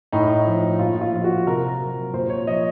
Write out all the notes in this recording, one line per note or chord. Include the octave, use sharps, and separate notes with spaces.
A2 D#4
F3
A#2 F4
F4
F3
F#4
C3 A#4
F#3
A#2 C5
C#5
F3 D#5